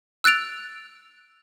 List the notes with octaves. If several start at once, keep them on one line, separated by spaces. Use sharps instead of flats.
E6 F#6 A6 D7 F7